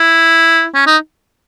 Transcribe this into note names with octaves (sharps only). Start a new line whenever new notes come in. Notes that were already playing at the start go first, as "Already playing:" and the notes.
Already playing: E4
C#4
D#4